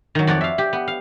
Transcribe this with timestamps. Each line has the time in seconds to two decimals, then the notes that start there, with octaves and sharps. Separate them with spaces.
0.15 D#3 F#3
0.27 F2 F#4 C#5 D5
0.41 E5 F5
0.58 G4
0.73 B3
0.88 F5